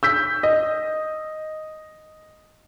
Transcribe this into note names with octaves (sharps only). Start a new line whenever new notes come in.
E6 G6 B6
D#5